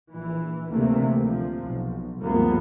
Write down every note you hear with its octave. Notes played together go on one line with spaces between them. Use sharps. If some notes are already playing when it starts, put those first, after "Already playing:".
A#1 E3
D2 C3 E3 A3 A#3
C3 F3
B1
G#1 D2 G2 F3 A#3 B3